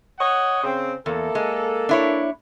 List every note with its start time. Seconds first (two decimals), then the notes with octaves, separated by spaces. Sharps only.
0.19 C#5 D#5 F#5
0.63 C#3 C4
1.06 E2 A#3 A4
1.35 G#3
1.89 D4 E4 C#5